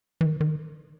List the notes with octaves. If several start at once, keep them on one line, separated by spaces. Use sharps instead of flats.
E3
D#3
D#3